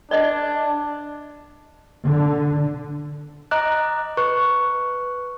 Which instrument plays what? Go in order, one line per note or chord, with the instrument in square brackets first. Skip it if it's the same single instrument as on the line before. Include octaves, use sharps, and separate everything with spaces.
[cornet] D4 [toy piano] D5 D#5
[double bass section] D3
[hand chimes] D#5 A#5 D6 F#6
B4 C#6 F#6